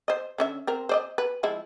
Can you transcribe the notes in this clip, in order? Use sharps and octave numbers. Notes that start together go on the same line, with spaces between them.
C5 D#5
D3 C#4 E5
C4 A#4
C5 D5 D#5
B4
F3 G#3 E4